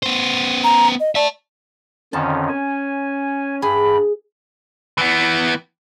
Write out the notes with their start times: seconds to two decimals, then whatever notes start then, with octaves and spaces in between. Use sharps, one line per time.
0.03 B3 C5
0.64 A#5
1.00 D#5
1.15 D5 E5 A5
2.13 F2 D3 D#3 C#4 A5
2.49 G#5
3.62 G2 G#4 B5
4.98 E3 B3